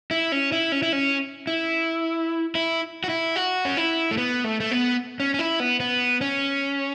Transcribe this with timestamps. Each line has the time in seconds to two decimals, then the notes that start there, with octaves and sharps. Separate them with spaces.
0.11 E4
0.32 C#4
0.52 E4
0.72 C#4
0.83 E4
0.93 C#4
1.47 E4
2.55 E4
3.04 F#4
3.09 E4
3.36 F#4
3.65 C#4
3.77 E4
4.11 A3
4.17 B3
4.44 A3
4.60 A3
4.71 B3
5.20 C#4
5.34 C#4
5.39 E4
5.60 B3
5.80 B3
6.21 C#4